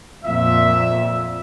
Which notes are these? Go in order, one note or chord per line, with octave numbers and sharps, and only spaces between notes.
F2 A#2 E5